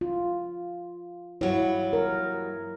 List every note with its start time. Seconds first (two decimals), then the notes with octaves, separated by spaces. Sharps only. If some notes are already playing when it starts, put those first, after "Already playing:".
0.01 F4
1.41 G2 F#3 E4 C#5
1.93 A#4